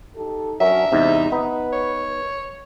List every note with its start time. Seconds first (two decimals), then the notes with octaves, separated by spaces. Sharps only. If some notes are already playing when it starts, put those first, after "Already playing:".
0.16 D#4 G4 A4
0.60 F#3 C#4 D4 A#4 E5
0.92 E2 G#2 C3 D#4
1.32 B3 D#4 B4
1.73 C#5